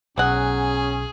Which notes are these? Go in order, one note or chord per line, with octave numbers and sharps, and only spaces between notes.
B1 F#3 C#4 G#4 F#5